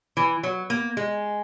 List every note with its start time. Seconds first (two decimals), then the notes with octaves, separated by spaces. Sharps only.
0.17 E3
0.43 F#3
0.70 A#3
0.97 G#3